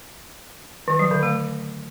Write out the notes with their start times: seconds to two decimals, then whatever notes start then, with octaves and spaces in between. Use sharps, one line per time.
0.88 D#3
0.99 F#3
1.11 D3
1.23 A3